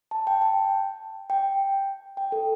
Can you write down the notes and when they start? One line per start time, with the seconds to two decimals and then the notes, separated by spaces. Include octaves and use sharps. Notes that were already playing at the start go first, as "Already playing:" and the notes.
0.11 A5
0.27 G5
0.42 A5
1.30 G5
2.17 G5
2.32 A4